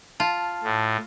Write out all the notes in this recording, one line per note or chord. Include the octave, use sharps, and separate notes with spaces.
F4 A5
A2